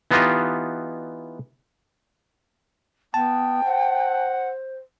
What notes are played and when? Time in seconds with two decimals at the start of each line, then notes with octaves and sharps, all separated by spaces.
0.11 E3 B3 D#4 F4 G4 D#5
3.14 B3 G5 A5
3.65 C5 F#5